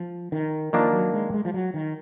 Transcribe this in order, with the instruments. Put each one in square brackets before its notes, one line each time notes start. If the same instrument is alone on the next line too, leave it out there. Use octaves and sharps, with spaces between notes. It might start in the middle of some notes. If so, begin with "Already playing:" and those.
Already playing: [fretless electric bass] F3
D#3
[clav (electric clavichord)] D#3 A#3 D4 [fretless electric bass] F3
[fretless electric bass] F#3
G#3
G#3
F3
F#3
D#3